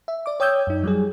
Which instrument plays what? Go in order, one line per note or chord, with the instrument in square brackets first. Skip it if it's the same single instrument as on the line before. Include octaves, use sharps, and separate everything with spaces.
[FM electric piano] E5
D5 D6
C#5 G5 D#6 E6 G6 G#6
F#2 D#4
F#3 G3 G#4